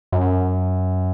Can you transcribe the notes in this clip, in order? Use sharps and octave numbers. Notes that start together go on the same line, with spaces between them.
F#2